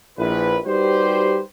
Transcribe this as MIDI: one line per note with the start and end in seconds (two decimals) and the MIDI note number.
0.18 0.58 34
0.18 0.58 64
0.18 0.58 71
0.65 1.40 55
0.65 1.40 63
0.65 1.40 66
0.65 1.40 67
0.65 1.40 71
0.65 1.40 72